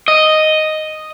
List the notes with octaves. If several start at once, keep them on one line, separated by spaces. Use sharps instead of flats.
D#5